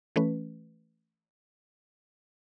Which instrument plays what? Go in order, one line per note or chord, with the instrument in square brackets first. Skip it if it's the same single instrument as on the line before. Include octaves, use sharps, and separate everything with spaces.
[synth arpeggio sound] E3 A3 C#4 B4